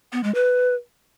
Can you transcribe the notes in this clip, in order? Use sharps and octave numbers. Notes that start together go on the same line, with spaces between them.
B3
G#3
B4